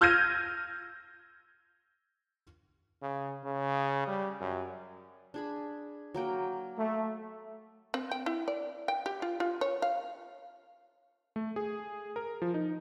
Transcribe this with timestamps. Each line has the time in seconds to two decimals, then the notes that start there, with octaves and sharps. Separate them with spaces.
0.01 E6 F6 G6 G#6 A#6 D#7
3.02 C#3
3.44 C#3
4.08 G3
4.41 F#2
5.34 D4 G#4 B5
6.14 F#3 A#3 G5
6.76 A3
7.94 C4
8.11 G5
8.26 E4
8.48 D5
8.88 G5
9.06 G4
9.22 F4
9.40 F4
9.61 C#5
9.82 F5
11.36 A3
11.56 G#4
12.16 A#4
12.42 F3
12.54 D#4